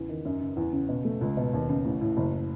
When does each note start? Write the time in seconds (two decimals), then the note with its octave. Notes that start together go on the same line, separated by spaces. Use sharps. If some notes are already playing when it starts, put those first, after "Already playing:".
Already playing: E2 C#3
0.09 D#3
0.25 F#2
0.41 C#3
0.57 E2
0.73 C#3
0.89 B2
1.05 A3
1.21 C#2
1.37 B2
1.53 D#2
1.69 C#3
1.85 A1
2.01 A2
2.17 F#1